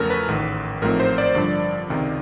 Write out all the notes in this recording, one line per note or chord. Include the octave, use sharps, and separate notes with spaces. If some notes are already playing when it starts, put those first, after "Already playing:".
Already playing: E2 C#3 F3 A3 C#4 A4 A#4
B4
A1 G#2 D#3
A1 G#2 F3 A3 C4 A#4
C5
D5
G2 D3 F3
C#2 C3 D#3